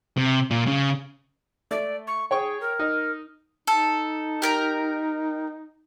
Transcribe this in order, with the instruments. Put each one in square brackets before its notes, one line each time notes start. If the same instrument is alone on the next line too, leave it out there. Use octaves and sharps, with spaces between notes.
[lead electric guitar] C3
A#2
C#3
[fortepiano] A3 [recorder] D5
[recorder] C#6
[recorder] G#4 [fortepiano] C#5 G5 C#6
[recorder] A#4
[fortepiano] D#4
[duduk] D#4 [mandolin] A4
[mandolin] G4 A#4 A#5